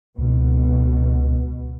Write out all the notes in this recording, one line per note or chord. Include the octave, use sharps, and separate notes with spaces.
C#2 B2